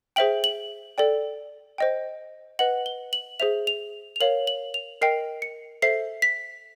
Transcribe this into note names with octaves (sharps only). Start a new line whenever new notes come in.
G#4 C5 E5 G5 F#7
F#7
A4 D5 G5
C5 D#5 G5
B4 D#5 F#5 F#7
G7
F#7
G#4 C5 E5 F7
F7
F7
A#4 C#5 F5 F#7
F#7
F7
A#4 D#5 G5 C7
C#7
A4 C5 E5 C7
B6